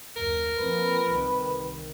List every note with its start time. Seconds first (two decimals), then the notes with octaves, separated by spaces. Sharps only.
0.16 F#1 D#2 A#4
0.58 F3 A#3 C4 B4
1.10 C2 C3 D#3